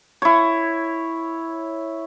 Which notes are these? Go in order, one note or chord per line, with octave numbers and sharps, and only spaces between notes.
E4 C#5